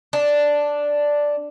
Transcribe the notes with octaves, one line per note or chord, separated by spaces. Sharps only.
D4